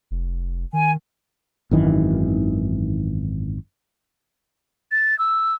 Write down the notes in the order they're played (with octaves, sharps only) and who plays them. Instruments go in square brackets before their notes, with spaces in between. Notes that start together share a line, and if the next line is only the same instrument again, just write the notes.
[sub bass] F1
[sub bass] D#3 [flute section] G#5
[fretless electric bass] G#1 F#2 D#3 E3
[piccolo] A6
E6